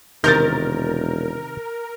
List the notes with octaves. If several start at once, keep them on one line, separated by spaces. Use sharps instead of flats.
E1 C3 D#3 A#4 G6 A6